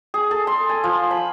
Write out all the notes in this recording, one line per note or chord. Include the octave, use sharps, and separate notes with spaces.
G#4
A4
C6
G#5
F3
B5